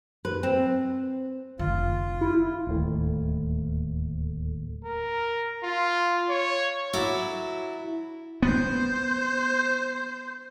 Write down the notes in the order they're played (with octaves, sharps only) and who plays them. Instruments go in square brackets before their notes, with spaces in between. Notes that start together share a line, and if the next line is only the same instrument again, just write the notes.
[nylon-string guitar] B4
C4
[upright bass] F1 D3 [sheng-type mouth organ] F4
[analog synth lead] E4
[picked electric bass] D1 D#2 A3
[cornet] A#4
F4
C#5
[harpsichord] F#3 A4 D6 [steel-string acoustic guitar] E4
[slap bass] B3 [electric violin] C5 G6